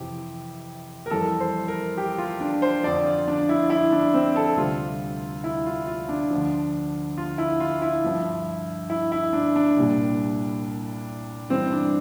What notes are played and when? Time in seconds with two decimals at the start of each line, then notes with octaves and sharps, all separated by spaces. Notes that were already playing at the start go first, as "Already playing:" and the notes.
Already playing: F2 C3 E3 G4
1.06 A#4
1.11 F2 E3 G3 A4
1.40 C5
1.68 A#4
1.98 G4
2.18 F4
2.40 D4
2.62 C5
2.83 F2 D3 F3 D5
3.05 F4
3.28 D4
3.49 E4
3.70 E4
3.92 D4
4.14 C4
4.36 A4
4.57 D2 C3 G3 F4
5.44 E4
5.66 F4
5.87 F4
6.09 D4
6.30 D2 D3 F3
7.18 F4
7.38 E4
7.60 F4
7.82 E4
8.04 G2 F3
8.90 E4
9.12 E4
9.33 D4
9.56 D4
9.77 C2 A#2 G3
11.50 G2 E3 G3 C4
11.72 D4